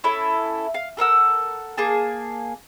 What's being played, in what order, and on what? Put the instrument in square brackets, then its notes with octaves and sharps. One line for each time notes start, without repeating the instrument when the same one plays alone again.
[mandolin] C#4 E4 A4
F5
A4 A#4 F#5 E6
A#3 G#4 A5